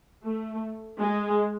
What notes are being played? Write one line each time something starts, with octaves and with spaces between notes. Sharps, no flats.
A3
G#3